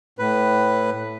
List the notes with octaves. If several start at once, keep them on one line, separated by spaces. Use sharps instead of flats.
A2 B4